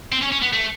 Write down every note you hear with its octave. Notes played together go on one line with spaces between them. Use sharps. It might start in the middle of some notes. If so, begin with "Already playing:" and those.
C4
C#4
C#4
B3
A3